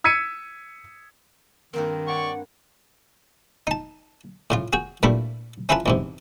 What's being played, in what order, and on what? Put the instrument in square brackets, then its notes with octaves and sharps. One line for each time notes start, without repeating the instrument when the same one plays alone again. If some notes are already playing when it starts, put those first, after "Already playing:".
[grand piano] E6 G#6 B6 C#7 D#7
[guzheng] G2 A#3 C4 [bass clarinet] D#3 [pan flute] A#4
[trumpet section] C#5 D5 C#6 [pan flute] F#5
[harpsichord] D#4 A5
A2 C#3 F4
F#4 G#4 G5
G2 A#2 G3 A3 E4
C#4 E4 F4 G#4 B4 A5
E2 G#2 C3